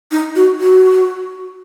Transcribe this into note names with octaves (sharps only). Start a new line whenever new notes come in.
D#4
F#4
F#4